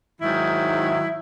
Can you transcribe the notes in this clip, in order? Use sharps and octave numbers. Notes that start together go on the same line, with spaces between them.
G#2 D#3 F#3 E4